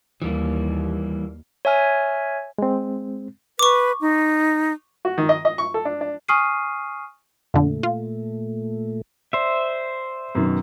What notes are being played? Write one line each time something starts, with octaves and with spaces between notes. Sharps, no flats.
D#2 E3 G3 A#3
C#5 E5 G#5 F6
G#3 C4
B4 C#6 D6
D#4
F#4
D#3
D#5
D#5
C#6
A4
D4
D4
G#5 C#6 D#6 F6 C7 D#7
F2 A#2 D3 A3
F4
C5 D5 E5
F#2 B2 D#3